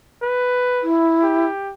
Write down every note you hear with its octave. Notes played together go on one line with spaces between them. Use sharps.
B4
E4
G4